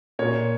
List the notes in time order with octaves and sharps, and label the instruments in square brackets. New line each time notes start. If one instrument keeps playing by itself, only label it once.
[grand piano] A#2 C#5